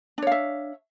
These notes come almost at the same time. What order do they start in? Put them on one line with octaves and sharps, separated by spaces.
D4 C#5 F5 E5